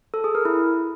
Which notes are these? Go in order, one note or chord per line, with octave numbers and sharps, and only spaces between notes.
A4
G#4
A#4
E4